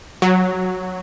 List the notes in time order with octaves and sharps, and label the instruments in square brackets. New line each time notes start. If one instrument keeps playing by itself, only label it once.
[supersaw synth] F#3